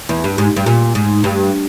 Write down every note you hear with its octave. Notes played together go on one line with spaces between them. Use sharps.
E2
G2
G#2
G2
A#2
G#2
G2